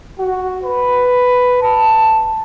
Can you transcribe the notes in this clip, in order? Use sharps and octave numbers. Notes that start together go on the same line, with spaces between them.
F#4
B4
A5